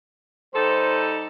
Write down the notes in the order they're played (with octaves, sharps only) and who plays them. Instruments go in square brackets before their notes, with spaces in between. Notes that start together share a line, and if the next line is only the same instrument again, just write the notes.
[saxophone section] G3 D#4 A4 [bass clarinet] C5